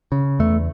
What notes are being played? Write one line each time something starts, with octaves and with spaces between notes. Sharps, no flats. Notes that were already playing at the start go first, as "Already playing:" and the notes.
C#3
E2 A3